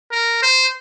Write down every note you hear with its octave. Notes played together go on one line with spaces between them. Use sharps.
A#4
C5